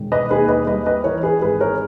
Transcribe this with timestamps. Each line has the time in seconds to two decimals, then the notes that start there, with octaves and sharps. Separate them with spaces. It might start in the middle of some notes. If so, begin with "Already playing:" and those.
Already playing: E1 D#3
0.12 B4 D#5
0.31 D#2 G#4 B4
0.48 B4 D#5
0.67 G3 B4 D#5
0.86 B4 D#5
1.04 E3 A#4 C#5
1.23 G#4 B4
1.42 G#1 G#4 B4
1.60 A#4 C#5